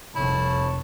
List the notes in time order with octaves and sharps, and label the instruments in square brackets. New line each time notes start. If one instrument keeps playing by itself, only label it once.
[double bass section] F1 C2 F2 [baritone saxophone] E4 [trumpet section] C#5 A5